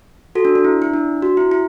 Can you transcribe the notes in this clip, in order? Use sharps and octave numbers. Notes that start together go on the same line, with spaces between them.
F#4 A4
D4
D4
E4
E4
D4
F#4
E4
E4